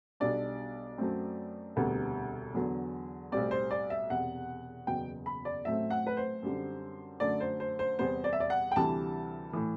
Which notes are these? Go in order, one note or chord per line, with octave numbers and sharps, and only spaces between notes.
B1 B2 G3 D4 D5
F#2 F#3 A3 C4
E1 D2 C3 G3 B3
E2 D3 F#3 B3
B1 A2 G3 C4 D5
C5
D5
E5
E1 E2 C3 F#5
F#1 E2 B2 F#3 B3 G5
B5
D5
A1 A2 F#3 A3 C4 E5
F#5
B4
C5
F#2 D3 G3 C4
F#2 D3 F#3 A3 D5
C5
C5
C5
E2 C3 G3 B3 C5
D5
E5
D5
F#5
G5
D2 C3 E3 G3 A5
A2 E3